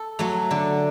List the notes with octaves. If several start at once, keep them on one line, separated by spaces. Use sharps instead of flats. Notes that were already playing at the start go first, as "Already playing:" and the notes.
Already playing: A4
F#3 A3
D3